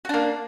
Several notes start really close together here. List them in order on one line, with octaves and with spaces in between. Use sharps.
F#4 D4 A#3